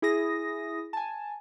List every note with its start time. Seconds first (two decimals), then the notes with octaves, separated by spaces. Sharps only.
0.02 E4 G#4 D#6 A#6
0.93 G#5 A5